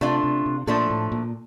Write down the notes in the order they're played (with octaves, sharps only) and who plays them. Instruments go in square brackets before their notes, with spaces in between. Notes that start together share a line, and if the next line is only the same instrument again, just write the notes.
[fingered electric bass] C3 [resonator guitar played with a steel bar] A3 D4 F4
[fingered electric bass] C3
C3
[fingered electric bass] A#2 [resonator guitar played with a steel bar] F3 A3 D4 A4
[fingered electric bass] A2
A#2